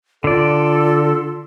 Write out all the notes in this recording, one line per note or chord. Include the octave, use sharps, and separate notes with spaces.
D3 F4 A4 D5